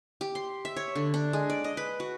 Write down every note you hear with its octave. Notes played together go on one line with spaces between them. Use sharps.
G4
C6
E5
C#5
D3
D4
G#3
D5
D#5
B4
F#4